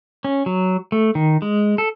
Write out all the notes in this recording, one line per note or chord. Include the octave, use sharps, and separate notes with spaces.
C#4
F#3
A3
D#3
G#3
A4